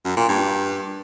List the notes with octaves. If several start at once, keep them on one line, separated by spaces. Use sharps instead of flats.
F#2
A#2
G2